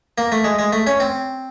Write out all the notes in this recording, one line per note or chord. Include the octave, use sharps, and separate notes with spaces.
A#3
A3
G#3
G#3
A3
C#4
C4